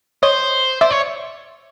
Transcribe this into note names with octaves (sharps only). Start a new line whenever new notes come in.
C5 C#5 D#5
C5 D5 E5
C#5